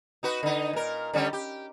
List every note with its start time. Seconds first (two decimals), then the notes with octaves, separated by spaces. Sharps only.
0.23 D#4 F#4 B4
0.43 D3 D#4
0.73 A#2 A#4
1.14 D3 G3 C#4
1.33 G4